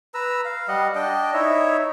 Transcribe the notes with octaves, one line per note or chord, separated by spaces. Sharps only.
B4 A#5 E6
F5
G3 D#5 F#5
D4 D#5 G5
D#4 E4 C#5 E5